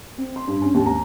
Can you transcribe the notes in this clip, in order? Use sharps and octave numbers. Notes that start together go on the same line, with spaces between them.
C4
C6
G2
C#4
D#2
A#5